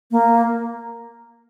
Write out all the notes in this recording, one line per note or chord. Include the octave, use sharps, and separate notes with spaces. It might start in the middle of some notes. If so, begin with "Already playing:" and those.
A#3